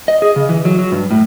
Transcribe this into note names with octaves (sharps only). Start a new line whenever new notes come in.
D#5
G#4
C#3
E3
F#3
F#3
G2
A2